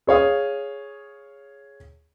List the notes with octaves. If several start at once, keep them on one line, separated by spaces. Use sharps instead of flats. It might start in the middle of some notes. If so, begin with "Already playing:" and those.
G#4 C#5 F5 D#6